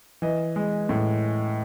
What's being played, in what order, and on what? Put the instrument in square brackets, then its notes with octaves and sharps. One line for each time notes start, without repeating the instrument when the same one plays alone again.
[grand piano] E3 D#5
G#3
A2